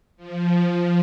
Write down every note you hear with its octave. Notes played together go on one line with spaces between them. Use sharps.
F3